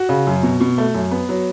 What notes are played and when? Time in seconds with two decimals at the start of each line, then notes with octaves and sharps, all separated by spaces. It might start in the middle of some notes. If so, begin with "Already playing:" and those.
Already playing: F#4
0.09 C#3
0.27 F#2
0.43 B2
0.61 B2
0.78 A3
0.94 F#2
1.11 B3
1.29 F#3